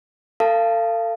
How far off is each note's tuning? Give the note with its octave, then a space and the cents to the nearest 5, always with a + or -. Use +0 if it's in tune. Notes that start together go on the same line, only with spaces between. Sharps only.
A4 +35 F5 -25 A5 +0